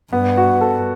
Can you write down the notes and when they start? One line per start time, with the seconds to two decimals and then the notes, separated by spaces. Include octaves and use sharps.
0.12 G2 B3
0.37 F#4
0.61 A4